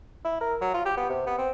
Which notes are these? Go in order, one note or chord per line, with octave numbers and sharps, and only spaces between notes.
E4
A#4
F#3
F4
G4
B3
C3
B3
C4